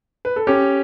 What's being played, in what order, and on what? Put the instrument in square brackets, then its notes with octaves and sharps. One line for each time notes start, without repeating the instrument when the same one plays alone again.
[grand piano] B4
A4
[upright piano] C#4 [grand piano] G4